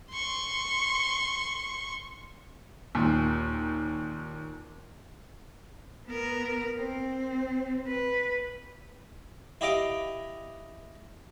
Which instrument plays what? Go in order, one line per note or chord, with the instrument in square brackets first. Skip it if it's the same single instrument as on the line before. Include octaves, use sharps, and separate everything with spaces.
[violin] C6 C#6
[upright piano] D#2 A#2
[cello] B3 A#4
C4
B4
[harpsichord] E4 G4 D#5 F5 D6